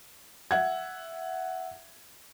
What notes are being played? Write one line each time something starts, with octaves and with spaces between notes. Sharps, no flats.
E5 F#5 G#6